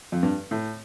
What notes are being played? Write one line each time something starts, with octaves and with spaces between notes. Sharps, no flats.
F2
G2
A2